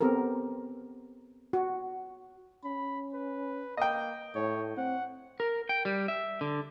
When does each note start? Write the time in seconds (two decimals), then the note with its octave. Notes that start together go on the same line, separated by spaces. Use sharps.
0.01 B3 C4 G4 A4 A#4
1.53 F#4
2.65 C#4 B5
3.14 B4
3.77 A#3 D#5 G5
4.35 A2 C#5
4.77 C4 F#5
5.40 A#4
5.69 G5
5.85 G3
6.08 E5
6.41 D3